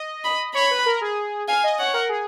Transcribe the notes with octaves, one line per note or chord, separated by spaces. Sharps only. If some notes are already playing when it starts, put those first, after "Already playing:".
Already playing: D#5
B5
C#5 B5
B4
A#4
G#4
F5 G#5
D#5
C#5 F#5
A#4
G#4